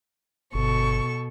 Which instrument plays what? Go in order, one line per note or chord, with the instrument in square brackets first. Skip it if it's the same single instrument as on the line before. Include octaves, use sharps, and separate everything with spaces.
[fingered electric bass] G1 [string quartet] B2 A4 C#6